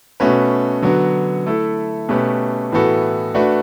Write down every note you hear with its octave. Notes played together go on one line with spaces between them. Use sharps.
B2 A3 C#4 F#4 B4
D3 F#3 B3 F#4
A3 E4 A4
B2 A3 C#4 G4 B4
A2 E3 B3 F#4 A4
A3 D4 F#4 B4